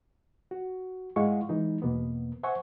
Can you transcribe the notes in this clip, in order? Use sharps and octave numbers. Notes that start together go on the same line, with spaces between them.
F#4
G#2 G#3 E4 F5 F#5 C#6
E3 G#3 D#4
E2 B2 A#3 B3
C5 E5 F#5 G#5 C#6